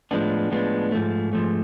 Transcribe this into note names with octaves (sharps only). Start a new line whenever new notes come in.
A2 F3 G#3 B3 D4
A2 F3 G#3 B3 D4
G#2 F3 A3
G#2 F3 A3